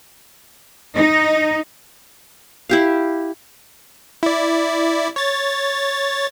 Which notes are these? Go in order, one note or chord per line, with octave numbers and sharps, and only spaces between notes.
D#4
E4 G4 F5
E4 D5
C#5 A6